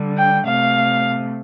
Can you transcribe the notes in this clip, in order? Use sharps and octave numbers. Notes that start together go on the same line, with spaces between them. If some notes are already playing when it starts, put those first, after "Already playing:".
Already playing: D3 G3
G5
C3 A3 F5